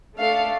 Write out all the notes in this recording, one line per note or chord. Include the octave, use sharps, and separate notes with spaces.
A3 D4 A4 F5